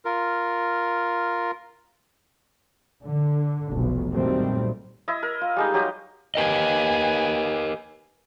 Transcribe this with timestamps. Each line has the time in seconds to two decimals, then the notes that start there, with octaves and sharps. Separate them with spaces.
0.05 F4 A#4
3.04 D3
3.70 F1 B1
4.10 A#2 D#3 F#3 G3 A3 C4
5.08 E4 D#5
5.23 A#4
5.41 F4
5.56 G3 G#3 D#4
5.74 F#3 G4 D#6
6.35 G4 A#4 B4 D#5 G#5